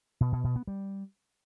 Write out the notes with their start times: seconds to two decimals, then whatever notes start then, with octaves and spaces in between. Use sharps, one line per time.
0.21 B2
0.32 B2
0.44 B2
0.56 B3
0.67 G3